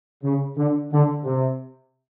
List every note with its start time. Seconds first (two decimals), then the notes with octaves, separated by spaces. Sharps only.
0.24 C#3
0.57 D3
0.92 D3
1.24 C3